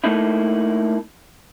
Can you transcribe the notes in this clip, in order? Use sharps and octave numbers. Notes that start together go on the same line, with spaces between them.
A3 A#3 D#4 E4